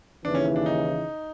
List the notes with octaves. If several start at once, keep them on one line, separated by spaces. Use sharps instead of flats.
D#2 C#3 E3 D4
C#4
D4
D#4